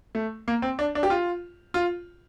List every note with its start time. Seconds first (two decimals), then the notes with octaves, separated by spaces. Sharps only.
0.15 A3
0.48 A#3
0.62 C4
0.79 D4
0.95 D4
1.03 G4
1.10 F4
1.74 F4